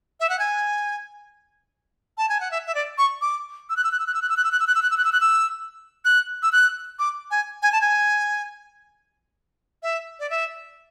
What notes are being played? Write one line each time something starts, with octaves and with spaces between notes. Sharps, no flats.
E5
F#5
G#5
A5
G#5
F#5
E5
E5
D5
C#6
D6
E6
F#6
E6
F#6
E6
F#6
E6
F#6
E6
F#6
E6
F#6
E6
F#6
E6
F#6
E6
F#6
E6
F#6
E6
F#6
E6
F#6
D6
G#5
G#5
A5
G#5
E5
D5
E5